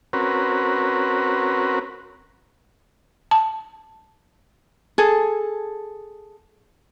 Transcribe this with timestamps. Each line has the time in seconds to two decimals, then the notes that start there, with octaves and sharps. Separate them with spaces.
0.13 C4 C#4 F#4 A#4 B4
3.31 A5
4.98 G#4 A4